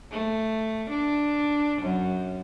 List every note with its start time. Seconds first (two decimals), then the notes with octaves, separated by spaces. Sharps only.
0.11 A3
0.90 D4
1.82 F#2